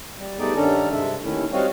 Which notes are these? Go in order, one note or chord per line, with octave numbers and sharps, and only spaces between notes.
G3
G3 A3 B3 D#4 G#4 D5
G2 D#3 C#4 D4 A4 A#5
G2 C3 G#3 A4 E5
D#2 D#3 A3 C#4 E4
G3 C4 F#4 C#5 D#5 F5